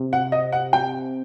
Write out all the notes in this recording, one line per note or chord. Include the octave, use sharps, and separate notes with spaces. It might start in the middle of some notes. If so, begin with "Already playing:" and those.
Already playing: C3
F#5
D#5
F#5
G5